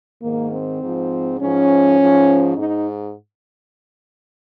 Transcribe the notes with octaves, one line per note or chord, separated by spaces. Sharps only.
G#2 D#3 A#3
C4
G#2 F3
G#2 F3 C#4
G#2 F3
G#2 D#4